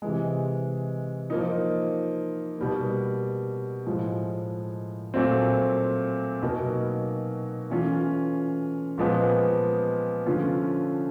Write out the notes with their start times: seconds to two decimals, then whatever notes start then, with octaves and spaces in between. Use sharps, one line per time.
0.02 C3 E3 G#3
1.30 F3 A#3 D#4
2.58 B2 G3 A#3
3.86 A2 F3 G#3
5.14 A#2 F#3 A3 C4
6.42 B2 F#3 A#3 D#4
7.70 E3 A3 C#4 F4
8.98 A#2 F3 G#3 B3
10.26 D3 F3 A3 C#4 F4